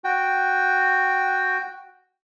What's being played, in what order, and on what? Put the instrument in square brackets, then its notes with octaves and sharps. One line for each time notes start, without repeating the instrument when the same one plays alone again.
[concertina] F#4 G5